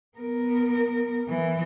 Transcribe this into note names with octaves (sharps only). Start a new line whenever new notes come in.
B3 A#4
E3